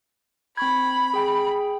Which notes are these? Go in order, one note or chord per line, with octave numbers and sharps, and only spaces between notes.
C4 B5 C#6 G#6
G#4 G5